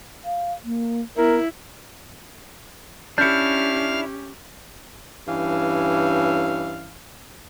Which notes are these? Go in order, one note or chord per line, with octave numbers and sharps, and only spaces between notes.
F5
A#3
B3 E4 A#4
C#4 D4 E4 G4 F5 F6 G6 C#7
G2 E3 C#4 F5